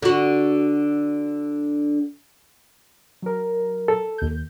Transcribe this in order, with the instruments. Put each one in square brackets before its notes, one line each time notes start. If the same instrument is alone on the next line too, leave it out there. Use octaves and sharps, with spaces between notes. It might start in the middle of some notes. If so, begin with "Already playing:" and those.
[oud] D3 F#4
[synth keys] F#3 A#4
[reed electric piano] A4
[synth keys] D#2 G6